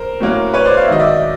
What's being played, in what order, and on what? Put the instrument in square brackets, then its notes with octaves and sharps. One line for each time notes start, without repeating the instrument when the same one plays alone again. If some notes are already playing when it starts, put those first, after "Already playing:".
Already playing: [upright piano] A#4 C5
A2 F#3 A#3 C#4
B4 C#5
C5 D5
F5
E5
G#2 D#3 F#3 D#5
D5 E5